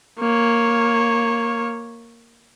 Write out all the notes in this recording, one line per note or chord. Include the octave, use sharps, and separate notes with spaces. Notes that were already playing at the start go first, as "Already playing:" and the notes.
A#3 C#5